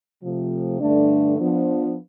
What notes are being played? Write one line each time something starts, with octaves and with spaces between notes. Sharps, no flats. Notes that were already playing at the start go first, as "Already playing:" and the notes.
C3 F3 A3
G2 D3 A3 D4
F3 B3 D4